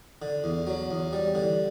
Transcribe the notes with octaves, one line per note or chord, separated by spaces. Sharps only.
D3
E2
F#3
E2
G3
D3